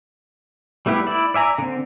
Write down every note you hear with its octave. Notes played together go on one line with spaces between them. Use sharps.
G3 A3 B3 E4 G4
E4 D5
D5 E5 G#5 A#5
D3 C4